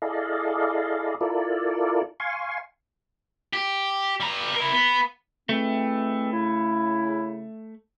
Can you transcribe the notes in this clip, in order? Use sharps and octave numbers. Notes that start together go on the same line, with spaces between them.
E4 G#4 A4 D5 D#5 F5
E4 F4 A4 A#4 D5
F5 G#5 C6 C#6
G4
G3 A#5
E4 A#4
B3
E3 G#3 A3 C4
C#3 E4